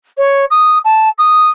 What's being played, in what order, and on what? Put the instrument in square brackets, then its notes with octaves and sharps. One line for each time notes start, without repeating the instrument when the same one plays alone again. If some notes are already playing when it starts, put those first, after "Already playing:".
[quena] C#5
D#6
A5
D#6